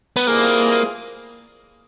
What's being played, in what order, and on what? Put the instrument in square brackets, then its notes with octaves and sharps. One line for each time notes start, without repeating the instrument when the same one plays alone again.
[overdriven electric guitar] B3
[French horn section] E3 G3 C4 F4 G#4 [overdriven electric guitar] A#3